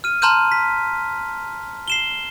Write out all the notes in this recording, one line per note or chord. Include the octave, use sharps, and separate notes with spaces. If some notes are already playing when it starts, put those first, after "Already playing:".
F6 D#7
A5 A#5 C6 F6 G6 D#7
B6
C7 E7 G7